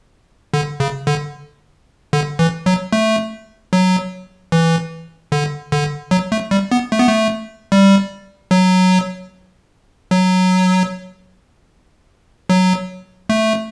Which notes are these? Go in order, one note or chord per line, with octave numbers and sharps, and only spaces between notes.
D3
C#3
D3
D3
E3
F#3
A3
F#3
E3
D3
D3
F#3
A3
G3
B3
A3
B3
A3
G3
F#3
F#3
F#3
A3